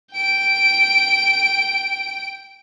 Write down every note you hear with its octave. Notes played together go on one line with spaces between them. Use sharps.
G5 D7